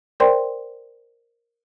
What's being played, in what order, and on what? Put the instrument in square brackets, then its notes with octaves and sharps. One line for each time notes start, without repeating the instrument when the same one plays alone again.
[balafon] A#4 C5 D5 G5 C6